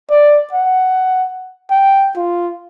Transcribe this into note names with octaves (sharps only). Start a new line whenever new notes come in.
D5
F#5
G5
F4